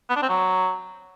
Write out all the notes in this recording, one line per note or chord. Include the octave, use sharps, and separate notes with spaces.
B3
D4
C4
F#3